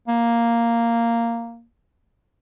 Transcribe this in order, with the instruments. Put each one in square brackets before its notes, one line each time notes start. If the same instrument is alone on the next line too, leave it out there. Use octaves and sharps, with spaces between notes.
[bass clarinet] A#3